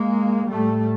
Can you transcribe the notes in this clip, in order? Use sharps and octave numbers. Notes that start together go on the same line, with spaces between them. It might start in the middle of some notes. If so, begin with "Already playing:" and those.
Already playing: G#3 A#3
A2 G3 A3